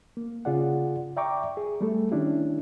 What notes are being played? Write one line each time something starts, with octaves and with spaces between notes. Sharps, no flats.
A#3
C#3 F4 G#4 D5 F#5
D5 E5 G5 A#5 C#6 D6
G#4
G3 A3 A4
D#3 C#4 D4 E4 G4